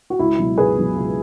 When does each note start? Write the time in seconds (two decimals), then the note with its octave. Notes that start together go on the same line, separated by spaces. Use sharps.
0.10 F#4
0.19 C#2 E4
0.39 B2 F#3
0.57 C#2 G#4 B4
0.77 B2 F#3
0.95 C#2